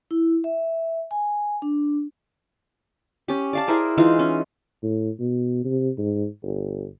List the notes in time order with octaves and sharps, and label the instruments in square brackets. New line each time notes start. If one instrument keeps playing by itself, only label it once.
[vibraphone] E4
E5
G#5
D4
[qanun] C#4 G4
D5 F5 A5
E4 G#4 A#4 C5
E3 G#3 D#4 F4
C#4
[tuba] A2
B2
C3
G#2
G1